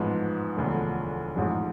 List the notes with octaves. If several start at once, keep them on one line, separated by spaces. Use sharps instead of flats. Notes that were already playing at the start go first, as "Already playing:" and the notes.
Already playing: A1 G#2 F3 G#3 B3
E1 D2 D3 F3
A1 G#2 F3 G#3